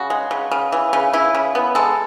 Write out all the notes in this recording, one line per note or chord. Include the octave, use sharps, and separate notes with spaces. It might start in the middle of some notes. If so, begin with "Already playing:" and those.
Already playing: C#3 F#4
G#3
C#3
C#3
E3
C#3
C#3 E4
C#3
B3
G#3 A4